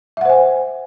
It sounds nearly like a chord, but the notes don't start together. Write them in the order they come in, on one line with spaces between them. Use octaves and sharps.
E5 F#5 C5 G#5